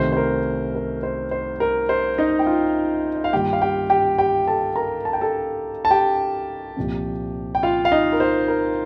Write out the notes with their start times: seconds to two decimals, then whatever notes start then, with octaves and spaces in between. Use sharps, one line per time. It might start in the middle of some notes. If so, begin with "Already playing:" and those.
Already playing: C2 C3 D#3 A3 C5
0.12 C5
0.17 A#4
0.75 A#4
1.03 C5
1.31 C5
1.60 A#4
1.89 C5
2.18 D#4 D#5
2.39 G5
2.46 F4 F5
3.15 D#5
3.24 F5
3.32 G2 D#3 A#3 F4 G4 G5
3.53 F5
3.62 G4 G5
3.90 G4 G5
4.18 G4 G5
4.48 A4 A5
4.76 A#4 A#5
5.05 A5
5.13 G5
5.21 A4 A5
5.85 A5
5.90 G4 G5
6.76 C2 A#2 F3 C4
7.55 G5
7.63 F4 F5
7.85 F5
7.92 D#4 D#5
8.13 A#4
8.20 C5
8.48 A#4